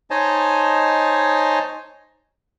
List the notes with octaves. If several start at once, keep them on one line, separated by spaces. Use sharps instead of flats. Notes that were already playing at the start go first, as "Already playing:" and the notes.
D#4 C5 C#5 D#5 G#5 A5